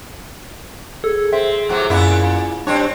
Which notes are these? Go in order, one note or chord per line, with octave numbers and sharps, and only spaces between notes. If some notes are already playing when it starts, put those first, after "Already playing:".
G#4 A4
C4 E5
A2 C3 F#3
F#2 A#2 B3 E4
G3 C4 D4 C#5